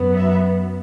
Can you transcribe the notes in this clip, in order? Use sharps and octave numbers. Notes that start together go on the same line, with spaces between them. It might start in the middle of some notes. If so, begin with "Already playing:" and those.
Already playing: F#2 F#3 B3
E5